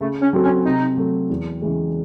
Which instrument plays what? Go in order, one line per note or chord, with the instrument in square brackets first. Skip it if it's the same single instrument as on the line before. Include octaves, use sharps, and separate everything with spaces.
[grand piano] C#3 [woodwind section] A3
[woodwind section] C#4
[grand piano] F#3 C4 F#4 A4
[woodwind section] C#4
[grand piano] C3 [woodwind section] D#4
[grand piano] F#3 A3
E2
C#3 E3 G#3